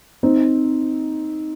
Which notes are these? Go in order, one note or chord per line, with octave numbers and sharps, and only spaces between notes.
C4 D#4